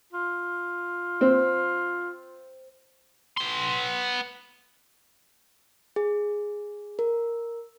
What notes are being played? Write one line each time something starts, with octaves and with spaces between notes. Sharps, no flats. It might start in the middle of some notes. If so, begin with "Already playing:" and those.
F4
C4
B3 C6
G#4
A#4